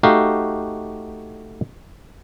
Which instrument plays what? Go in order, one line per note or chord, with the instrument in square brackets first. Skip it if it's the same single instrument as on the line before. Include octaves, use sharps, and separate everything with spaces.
[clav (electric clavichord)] A3 D#4 F#4 G4 F5